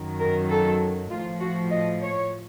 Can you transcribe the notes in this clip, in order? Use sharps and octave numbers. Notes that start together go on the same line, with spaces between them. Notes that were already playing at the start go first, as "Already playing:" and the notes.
Already playing: F#2 D#3 F#3
A#4
A4
A2 F3 F4
F#4
D#5
C#5